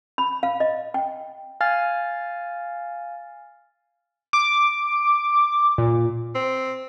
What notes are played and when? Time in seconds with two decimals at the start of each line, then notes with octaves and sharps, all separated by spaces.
0.18 B5
0.43 F5
0.60 D#5
0.94 G5
1.61 F5 G#5 F6 A6
4.33 D6
5.78 A#2
6.35 C4